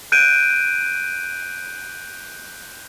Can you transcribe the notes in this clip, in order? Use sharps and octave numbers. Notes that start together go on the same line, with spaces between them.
F#6 G6 D7 D#7